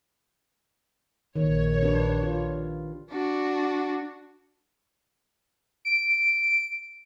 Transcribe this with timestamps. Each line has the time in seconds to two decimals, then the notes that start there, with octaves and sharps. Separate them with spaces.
1.36 A#1 D#3 C#5
1.83 D4 G4 B4
2.23 F4
3.11 D4 F#4
5.85 D7